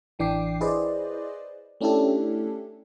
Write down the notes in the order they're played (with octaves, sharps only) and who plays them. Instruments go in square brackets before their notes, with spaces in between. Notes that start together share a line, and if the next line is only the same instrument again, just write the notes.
[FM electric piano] A1 E3 D4 G5 D6 C7
E4 G#4 B4 C5 D5 D#5
A3 C#4 D4 E4 G4 A4